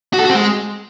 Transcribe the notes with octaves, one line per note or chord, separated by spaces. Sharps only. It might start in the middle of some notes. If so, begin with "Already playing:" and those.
F#4
A4
F#4
C4
G#3